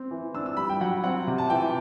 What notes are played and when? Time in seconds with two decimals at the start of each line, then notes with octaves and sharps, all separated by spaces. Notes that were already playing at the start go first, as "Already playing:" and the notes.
Already playing: C4
0.11 E3
0.34 D4 E6
0.46 E6
0.57 G3 B5
0.69 G5
0.81 F#3 F#5
1.04 C4 F#5
1.27 C3
1.38 A5
1.50 E3 G5